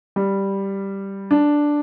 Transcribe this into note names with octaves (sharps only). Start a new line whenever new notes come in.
G3
D4